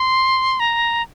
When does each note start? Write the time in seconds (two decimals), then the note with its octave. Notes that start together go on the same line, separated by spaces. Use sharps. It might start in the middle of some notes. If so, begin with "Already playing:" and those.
Already playing: C6
0.60 A#5